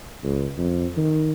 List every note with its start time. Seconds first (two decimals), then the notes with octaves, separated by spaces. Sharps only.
0.24 C#2
0.58 F2
0.97 D#3